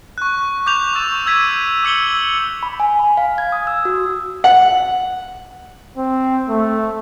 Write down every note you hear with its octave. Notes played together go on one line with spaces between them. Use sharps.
C#6 F#6
D6 G6 F7
C#6 D6 E6 A6 E7
E6 G#6 B6 D#7
D6 E6 C#7 F#7 G7
B5
G#5
B5
F5
G#6
D#6
E6
F#4
F#5
C4
A3